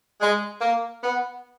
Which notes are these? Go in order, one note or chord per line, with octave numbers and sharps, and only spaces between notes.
G#3
A#3
B3